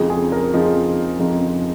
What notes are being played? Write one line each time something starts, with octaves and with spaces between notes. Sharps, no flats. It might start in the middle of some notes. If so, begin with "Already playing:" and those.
Already playing: F2 C#3 F3 G#3 D#4
G#4
A#4
F2 C#3 F3 G#3 D#4
F2 C#3 F3 G#3 D#4